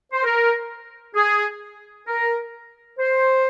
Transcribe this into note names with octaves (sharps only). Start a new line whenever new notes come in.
C5
A#4
G#4
A#4
C5